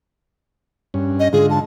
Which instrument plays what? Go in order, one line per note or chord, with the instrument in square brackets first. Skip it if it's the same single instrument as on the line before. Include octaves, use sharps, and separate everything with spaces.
[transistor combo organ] G2 C#4
[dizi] D#5
[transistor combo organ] G#2 D3 F4 [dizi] G#4
[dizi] A5